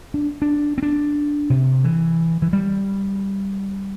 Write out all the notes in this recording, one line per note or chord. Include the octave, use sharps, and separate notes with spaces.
D4
D4
C4
D4
C3
E3
E3
G3